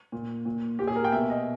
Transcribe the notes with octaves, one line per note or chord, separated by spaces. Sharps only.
A#2
A#2
A#2 G4
G#4
A#4
G5
B2 E5
D#5